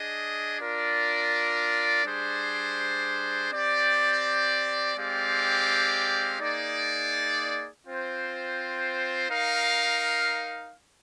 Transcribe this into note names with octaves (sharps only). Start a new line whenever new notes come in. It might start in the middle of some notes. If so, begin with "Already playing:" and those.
Already playing: D4 G#4 D#5
D4 F4 A#4 D5
G3 D4 G#4 C5
C4 G4 D5 G5
G#3 C4 G4 D5 F5
A#3 D#4 G#4 D5
C4 F4 C5 G5
D#4 A#4 F5